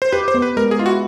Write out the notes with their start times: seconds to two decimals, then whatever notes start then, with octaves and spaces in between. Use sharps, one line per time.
0.02 C5
0.12 G4 B4
0.28 C5
0.34 B3
0.42 B4
0.57 G#3 A#4
0.71 G#4
0.79 E4 F4
0.86 F#4